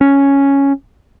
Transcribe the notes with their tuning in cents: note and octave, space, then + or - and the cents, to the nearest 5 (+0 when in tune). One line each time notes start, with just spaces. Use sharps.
C#4 +0